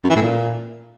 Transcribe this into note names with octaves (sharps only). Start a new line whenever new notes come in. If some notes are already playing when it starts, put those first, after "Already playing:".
F#2
E3
A2
A#2